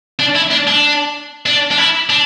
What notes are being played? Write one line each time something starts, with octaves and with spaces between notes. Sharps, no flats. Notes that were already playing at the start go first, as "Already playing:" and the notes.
D4
E4
D4
D4
D4
D4
E4
D4